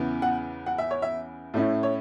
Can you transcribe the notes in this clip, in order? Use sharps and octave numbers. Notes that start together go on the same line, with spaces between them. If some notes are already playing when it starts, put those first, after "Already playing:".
Already playing: E2 C#3 E3 B3
F#5
F#5
E5
C#5
E5
A2 A3 C#4 E4
C#5